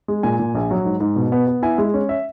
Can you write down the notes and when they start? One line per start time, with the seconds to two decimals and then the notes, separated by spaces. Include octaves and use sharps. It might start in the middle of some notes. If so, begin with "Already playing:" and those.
0.08 G#3
0.23 A#2 G#5
0.39 A#2
0.55 A#1
0.71 F#3
0.85 G#2
1.00 G#2
1.16 B2
1.32 B3
1.47 B3
1.62 E4 G#5
1.78 G#3
1.94 C#4
2.09 E5